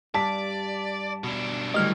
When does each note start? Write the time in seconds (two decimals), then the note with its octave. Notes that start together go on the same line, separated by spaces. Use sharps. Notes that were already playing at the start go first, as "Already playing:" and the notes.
0.14 G2 D5 A5 B6
1.24 B2 D4
1.74 C#2 F#2 A2 D3 E3 G3 D#5 F6